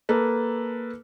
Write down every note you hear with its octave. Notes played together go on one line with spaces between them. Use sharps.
A#3 A4 B4